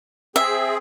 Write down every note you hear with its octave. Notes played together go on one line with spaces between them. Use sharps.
C4 G#4 E5